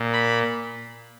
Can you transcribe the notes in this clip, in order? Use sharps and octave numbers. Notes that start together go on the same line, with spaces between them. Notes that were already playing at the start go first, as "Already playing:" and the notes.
Already playing: A#2
B5